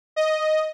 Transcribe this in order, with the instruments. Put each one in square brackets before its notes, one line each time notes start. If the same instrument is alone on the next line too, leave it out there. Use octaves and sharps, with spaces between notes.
[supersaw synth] D#5